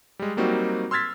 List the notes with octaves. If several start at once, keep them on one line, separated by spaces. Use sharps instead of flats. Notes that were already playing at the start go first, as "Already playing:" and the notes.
G3 G#3
F#3 G3 A#3 C4 D#4 F#4
C6 E6 F6 G#6 A6 B6